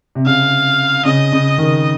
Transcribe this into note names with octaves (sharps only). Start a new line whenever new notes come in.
C3
C#3 F5
C#3 D#5
C#3
D#3